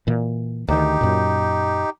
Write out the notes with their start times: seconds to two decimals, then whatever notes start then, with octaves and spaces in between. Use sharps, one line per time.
0.07 A#2 E3
0.68 D2 D#3 D#4 G4
1.01 F#2 A#2